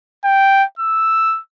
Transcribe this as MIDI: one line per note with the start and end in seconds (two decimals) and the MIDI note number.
0.24 0.64 79
0.79 1.39 88